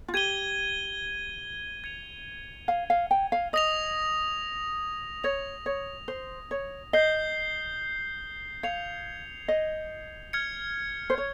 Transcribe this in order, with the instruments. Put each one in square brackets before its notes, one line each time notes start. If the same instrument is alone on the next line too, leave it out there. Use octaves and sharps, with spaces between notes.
[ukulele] F4
[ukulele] G4 [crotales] G#6 D#7 G7
[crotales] G#6 C#7 F7
[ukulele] F5
F5
G5
F5
[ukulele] D#5 [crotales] D#6 A#6 F7
[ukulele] C#5 [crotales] D#6 A#6 F7
[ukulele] C#5
C5
C#5
[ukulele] D#5 [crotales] G6 C7 G7
[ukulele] F5 [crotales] G#6 C#7 F7
[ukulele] D#5
[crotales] F6 G#6 C#7
[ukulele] C5
C#5